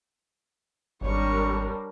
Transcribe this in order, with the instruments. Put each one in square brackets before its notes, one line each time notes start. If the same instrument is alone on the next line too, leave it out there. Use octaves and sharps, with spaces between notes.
[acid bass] G#1 [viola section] G3 D4 A#4 [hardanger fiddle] C#5 C#6